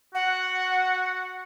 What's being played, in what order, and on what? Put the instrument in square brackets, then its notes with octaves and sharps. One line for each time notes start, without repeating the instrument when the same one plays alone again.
[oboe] F#4 [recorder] F#5